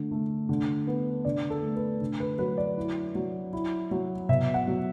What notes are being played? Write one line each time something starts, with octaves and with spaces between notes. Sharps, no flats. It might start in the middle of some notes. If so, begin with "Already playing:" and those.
Already playing: D3 A3
A3
D3
B3
D3 D5
A4
A3
B4
D3
B4
F#3 B4
D5
E4
F#3
E4
F#3
B2 E5
F#5
F#3